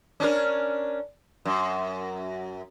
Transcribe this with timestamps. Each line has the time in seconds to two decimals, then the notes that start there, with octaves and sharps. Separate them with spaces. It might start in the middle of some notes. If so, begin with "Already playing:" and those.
0.20 C#4 D4 A#4
1.45 F#2